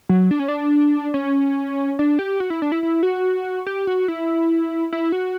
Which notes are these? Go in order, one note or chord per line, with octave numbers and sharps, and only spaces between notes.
F#3
D4
C#4
D4
C#4
D4
G4
F#4
E4
D4
E4
E4
F#4
G4
F#4
E4
E4
F#4